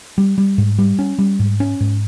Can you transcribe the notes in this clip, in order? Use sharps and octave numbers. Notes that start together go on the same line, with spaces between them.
G3
G3
G#2
G3
C#4
G3
G#2
C#4
G#2